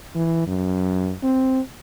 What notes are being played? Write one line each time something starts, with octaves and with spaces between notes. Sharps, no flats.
E3
F#2
C4